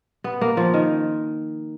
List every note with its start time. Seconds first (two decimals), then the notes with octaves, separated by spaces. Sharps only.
0.24 B3
0.41 A#3
0.57 F3
0.74 D#3